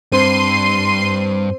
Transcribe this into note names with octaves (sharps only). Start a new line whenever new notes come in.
G2 C4 C6 C7 D#7